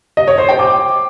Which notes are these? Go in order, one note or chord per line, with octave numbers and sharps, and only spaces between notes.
D#5
C#5
C5
G5
D6